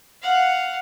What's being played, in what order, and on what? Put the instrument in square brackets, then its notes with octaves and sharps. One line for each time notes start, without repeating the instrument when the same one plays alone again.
[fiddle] F5 F#5